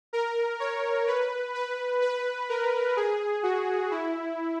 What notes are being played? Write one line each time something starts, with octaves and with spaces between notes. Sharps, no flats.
A#4
C#5
B4
B4
B4
A#4
G#4
F#4
E4